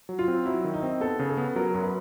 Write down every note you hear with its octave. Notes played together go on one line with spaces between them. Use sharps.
F#3
F4
C4
F#3 E4
D#3
D#4
C4
B3 A4
C#3
A4
B3
F#3 A#4
F#2
B4